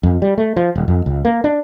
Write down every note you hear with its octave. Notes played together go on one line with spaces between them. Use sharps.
F2
G3
A3
F3
D#1
F2
C#2
A#3
D4